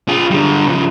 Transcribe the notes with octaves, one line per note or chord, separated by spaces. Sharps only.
F4 G#4
D3 G3
C#3 F3